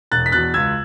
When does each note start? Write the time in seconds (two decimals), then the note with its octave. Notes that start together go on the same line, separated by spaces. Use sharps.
0.11 E1 F#6 A6
0.26 B6
0.32 E2 B2 F#6 A6
0.54 C#2 E6 G#6